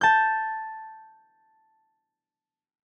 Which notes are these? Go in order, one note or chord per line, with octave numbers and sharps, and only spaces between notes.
A5 G6